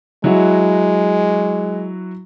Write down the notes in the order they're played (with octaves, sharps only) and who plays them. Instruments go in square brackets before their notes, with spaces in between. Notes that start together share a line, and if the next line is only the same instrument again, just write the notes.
[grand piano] F#3 E4 F#4 [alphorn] G#3